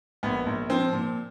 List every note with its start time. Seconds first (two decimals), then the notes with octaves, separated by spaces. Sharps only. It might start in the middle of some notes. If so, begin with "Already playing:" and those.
0.23 A#1 B3
0.46 A#1
0.70 F3 C4
0.93 A#2